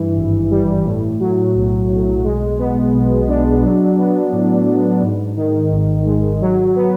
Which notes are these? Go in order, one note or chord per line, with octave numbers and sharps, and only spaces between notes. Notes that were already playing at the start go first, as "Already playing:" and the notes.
Already playing: G2 E3
G#1
G3
A2
F#3
B1
B1
G#3
B3
B2
D4
F#3
B3
A2
A2
G#2
D#3
G#1
G#3
F#3
B3